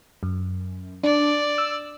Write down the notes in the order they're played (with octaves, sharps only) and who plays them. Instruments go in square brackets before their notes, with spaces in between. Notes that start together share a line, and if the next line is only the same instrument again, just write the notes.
[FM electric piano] F#2
[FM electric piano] D4 [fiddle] D5
[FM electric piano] E6